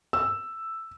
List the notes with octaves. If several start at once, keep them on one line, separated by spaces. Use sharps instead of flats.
E6